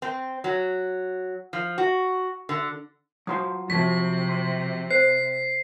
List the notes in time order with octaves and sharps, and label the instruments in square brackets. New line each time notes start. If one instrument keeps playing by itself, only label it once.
[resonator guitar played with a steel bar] C4
F#3
F3
F#4
D3
[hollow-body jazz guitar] F#3 F4 C6 [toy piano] D#6
[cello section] C3 [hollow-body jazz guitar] F3 F#3 [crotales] B6
[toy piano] C6
[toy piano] C5 [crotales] C7